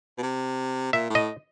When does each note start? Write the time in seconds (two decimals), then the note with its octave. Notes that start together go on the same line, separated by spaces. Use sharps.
0.18 B2
0.23 C3
0.93 A#2 E5
1.10 A2
1.15 D#5